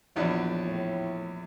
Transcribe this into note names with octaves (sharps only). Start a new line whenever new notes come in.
A#1 E2 F#3 D4
A2